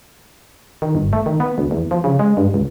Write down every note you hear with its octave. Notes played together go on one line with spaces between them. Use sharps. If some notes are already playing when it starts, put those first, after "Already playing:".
D#3
G1
A3
D#3
B3
D2
E2
F3
C#3
G#3
G2
C#2